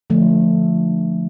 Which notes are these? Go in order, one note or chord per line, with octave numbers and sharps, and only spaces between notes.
D3 F3 A3